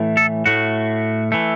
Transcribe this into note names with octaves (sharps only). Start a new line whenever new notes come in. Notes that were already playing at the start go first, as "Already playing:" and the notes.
Already playing: A2 E3 A3
A4
A2 A3 F#4
E3 A3